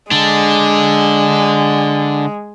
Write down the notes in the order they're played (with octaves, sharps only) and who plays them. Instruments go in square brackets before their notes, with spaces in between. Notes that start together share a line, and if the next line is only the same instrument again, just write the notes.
[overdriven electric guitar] D3 D4 [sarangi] G#3